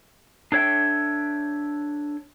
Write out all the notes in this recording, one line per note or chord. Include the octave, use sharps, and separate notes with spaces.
D4 A4 C#5 E5 G5